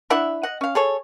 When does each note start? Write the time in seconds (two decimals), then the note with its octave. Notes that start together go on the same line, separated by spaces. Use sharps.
0.10 D4 E4 E5 F#5
0.43 D#5 F#5
0.61 C#4 F5
0.75 G#4 A4 C#5